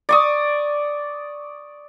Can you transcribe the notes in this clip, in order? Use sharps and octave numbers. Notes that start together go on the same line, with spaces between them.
D5 C#6 D#6